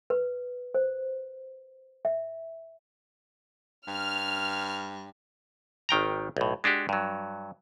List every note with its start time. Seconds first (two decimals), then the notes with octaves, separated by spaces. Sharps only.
0.10 B4
0.75 C5
2.05 E5
3.88 G2 F6
5.89 G#1 D#3 G5 A#5
6.37 B1 A2
6.64 G#3 D4 F#4 G4
6.89 G2 F#3